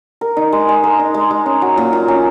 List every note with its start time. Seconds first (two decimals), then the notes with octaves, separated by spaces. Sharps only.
0.21 A#4
0.37 D#4
0.53 G#3
0.69 G#3
0.84 A#4
0.99 D#4
1.14 G#3
1.31 G#3
1.46 C#4
1.62 F#3
1.77 A#2
1.93 A#2
2.08 C#4